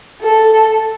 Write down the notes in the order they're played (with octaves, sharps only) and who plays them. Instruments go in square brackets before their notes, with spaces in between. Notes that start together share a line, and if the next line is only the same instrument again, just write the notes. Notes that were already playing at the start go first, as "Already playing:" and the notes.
[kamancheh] A4